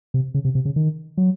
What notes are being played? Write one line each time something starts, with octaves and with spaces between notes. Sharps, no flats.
C3
C#3
C3
C3
C#3
D#3
F#3